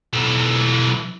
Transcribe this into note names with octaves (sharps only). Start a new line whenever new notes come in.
B1 E3